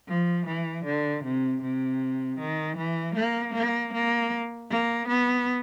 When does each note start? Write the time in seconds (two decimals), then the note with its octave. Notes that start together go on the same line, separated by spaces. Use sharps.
0.08 F3
0.46 E3
0.85 D3
1.24 C3
1.62 C3
2.39 D#3
2.77 E3
3.16 A#3
3.55 A#3
3.94 A#3
4.71 A#3
5.08 B3